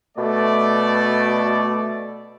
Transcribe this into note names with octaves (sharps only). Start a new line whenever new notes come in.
B2 A3 D5